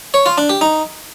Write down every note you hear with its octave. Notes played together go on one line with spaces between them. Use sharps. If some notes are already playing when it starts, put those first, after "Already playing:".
C#5
F4
D4
G4
D#4